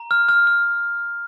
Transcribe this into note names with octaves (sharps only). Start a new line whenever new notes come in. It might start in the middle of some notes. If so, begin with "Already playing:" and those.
Already playing: A#5
F6
F6
F6